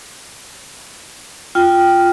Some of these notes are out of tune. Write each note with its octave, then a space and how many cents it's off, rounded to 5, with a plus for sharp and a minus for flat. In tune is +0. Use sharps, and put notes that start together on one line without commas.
F4 +0 G5 +0